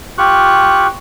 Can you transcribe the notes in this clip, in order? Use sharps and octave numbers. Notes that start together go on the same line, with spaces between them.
F4 G4 C#6 F#6